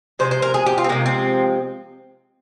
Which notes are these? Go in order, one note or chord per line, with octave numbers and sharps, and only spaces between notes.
C3 F3 G#3 C5
C5
A#4
G#4
G4
F4
C4
C3 F3 G#3 A#3
C4